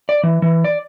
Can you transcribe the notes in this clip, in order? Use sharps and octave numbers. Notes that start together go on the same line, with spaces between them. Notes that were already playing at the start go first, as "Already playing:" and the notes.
D5
E3
E3
D5